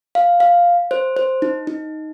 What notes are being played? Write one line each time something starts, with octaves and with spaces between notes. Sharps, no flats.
F5
F5
C5
C5
D#4
D#4